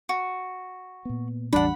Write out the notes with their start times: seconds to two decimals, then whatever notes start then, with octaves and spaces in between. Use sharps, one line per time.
0.09 F#4
1.05 A#2 B3
1.53 A1 E2 G3 D4 F#5 B5